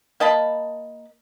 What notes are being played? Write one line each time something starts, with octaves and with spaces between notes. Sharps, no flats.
A#3 D#5 A5 B5